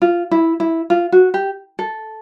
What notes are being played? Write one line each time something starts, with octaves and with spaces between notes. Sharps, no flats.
F4
E4
E4
F4
F#4
G4
A4